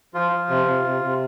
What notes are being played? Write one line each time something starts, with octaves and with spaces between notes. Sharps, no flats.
F3 F4
F3
C3
C3
C3
C3